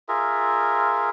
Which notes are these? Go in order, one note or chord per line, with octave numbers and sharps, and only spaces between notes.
F4 G#4 A#4 E5